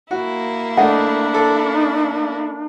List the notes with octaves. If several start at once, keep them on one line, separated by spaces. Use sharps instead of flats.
A#3 E4 F#4
A3 D4 D#5 F#5
A4